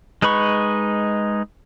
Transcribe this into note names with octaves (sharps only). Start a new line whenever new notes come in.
G#3 D#4 B4 B5 C#6